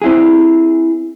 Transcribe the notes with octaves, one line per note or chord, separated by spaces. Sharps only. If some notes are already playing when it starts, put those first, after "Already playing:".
C4 E4 G#4